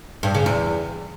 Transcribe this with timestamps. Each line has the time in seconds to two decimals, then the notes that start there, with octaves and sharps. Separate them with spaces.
0.23 G2
0.35 C#3
0.46 E2